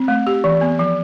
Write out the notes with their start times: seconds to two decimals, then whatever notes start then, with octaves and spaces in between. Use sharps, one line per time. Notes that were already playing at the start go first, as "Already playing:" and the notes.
Already playing: C4
0.08 A3
0.27 G4
0.44 E3
0.61 B3
0.79 F3